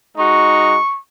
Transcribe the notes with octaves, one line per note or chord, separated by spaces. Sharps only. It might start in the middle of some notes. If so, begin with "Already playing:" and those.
G#3 D#4 F#4 C#6